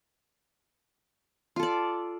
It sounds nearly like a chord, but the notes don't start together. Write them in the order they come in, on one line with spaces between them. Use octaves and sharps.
F4 A4 D5